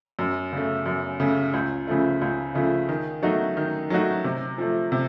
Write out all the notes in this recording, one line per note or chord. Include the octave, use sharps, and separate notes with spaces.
F#2
C#3 A3
F#2
C#3 A3
C#2
C#3 F3 A3
C#2
C#3 F3 A3
D#3
F#3 A3 D#4 F#4
D#3
F#3 A3 D#4 F#4
C3
F3 A3
C3